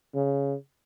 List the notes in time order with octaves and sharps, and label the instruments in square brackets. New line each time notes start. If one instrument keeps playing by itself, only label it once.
[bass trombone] C#3